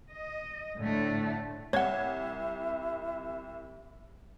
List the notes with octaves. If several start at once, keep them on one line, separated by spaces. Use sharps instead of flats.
D#5
A2 D3 A3
C2 E4 C#5 F#5 G#6